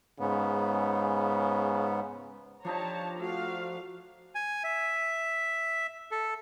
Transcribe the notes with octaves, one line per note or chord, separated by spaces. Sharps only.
G#2 C#3 B3
F3 D4 D#4 G4 C#5 A5 A#5
A3 F#4 F5
G#5
E5
A4